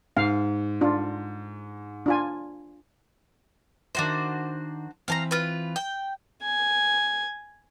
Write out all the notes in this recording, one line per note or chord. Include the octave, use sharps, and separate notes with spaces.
G#2 F5
D4 F4
D4 F4 G#5
D#3 D4 F#4 C5 E5
E3 C4 F5 A5 A#5
F4 B4
G5
G#5